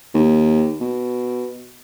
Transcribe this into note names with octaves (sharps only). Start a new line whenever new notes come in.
D#2
B2